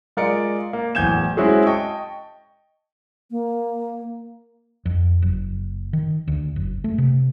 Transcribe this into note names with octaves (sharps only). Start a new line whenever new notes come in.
G#3 F4 A#4 D5 D#5 C#7
A#3
D1 E2 G#5 G6 G#6 E7
G#3 C4 C#4 E4 F#4 G#4
D#5 G5 A5 C#6
A#3
F2
F#1
D#3
D2
F#1
A3
C3